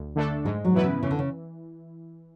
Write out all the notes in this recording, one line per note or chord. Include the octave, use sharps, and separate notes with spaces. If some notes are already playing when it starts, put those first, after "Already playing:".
Already playing: D2
D3 A3 D4 A4
G#2 G#3
F#3
B2 E3 B3 E4 B4
C#3
C#3 E3
D3
C#3